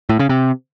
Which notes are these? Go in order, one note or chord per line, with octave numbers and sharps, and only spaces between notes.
A2
C#3
C3